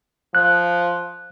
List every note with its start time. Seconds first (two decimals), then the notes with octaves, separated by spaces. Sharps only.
0.35 F3 F#6